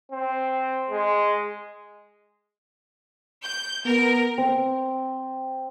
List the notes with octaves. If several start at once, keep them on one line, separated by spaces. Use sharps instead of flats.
C4
G#3
G6
B3 A#4
C4